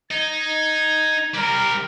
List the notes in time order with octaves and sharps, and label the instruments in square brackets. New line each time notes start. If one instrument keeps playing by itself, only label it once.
[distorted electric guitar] D#4 [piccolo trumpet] G#6
[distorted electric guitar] G3 C4 [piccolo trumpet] A#4